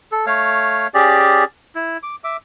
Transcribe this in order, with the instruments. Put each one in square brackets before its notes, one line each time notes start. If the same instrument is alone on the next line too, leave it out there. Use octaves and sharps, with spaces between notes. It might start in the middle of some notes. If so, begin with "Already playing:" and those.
[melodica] A4
A3 C#5 F5
C#4 G4 G#4 D5
E4
D6
E5 D6